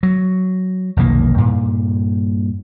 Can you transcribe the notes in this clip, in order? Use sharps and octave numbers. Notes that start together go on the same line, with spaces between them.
F#3
F1 B1 D#3 A#3
G2 A#2